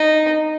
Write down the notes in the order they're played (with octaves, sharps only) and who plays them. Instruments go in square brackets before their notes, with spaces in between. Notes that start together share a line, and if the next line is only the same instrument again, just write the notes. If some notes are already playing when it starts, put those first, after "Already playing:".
Already playing: [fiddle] D#4